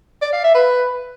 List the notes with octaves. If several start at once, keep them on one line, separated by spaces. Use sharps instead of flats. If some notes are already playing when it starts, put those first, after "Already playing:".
D5
F5
E5
B4